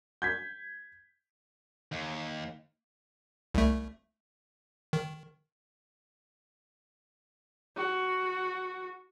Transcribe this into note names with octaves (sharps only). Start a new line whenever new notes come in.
G6 G#6 B6
D#2
C2 A3
D#3
F#4